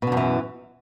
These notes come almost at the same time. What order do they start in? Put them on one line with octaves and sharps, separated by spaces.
B2 D3 F#2 E3